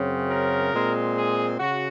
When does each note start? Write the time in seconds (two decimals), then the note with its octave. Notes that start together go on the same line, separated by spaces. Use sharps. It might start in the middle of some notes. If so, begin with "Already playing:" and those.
Already playing: F#2 C#3 F#3 C4
0.29 A#4
0.72 A#2 G#3 C4
1.15 G#4
1.59 C#3 F#4